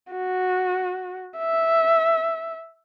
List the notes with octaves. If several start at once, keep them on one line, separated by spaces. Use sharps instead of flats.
F#4
E5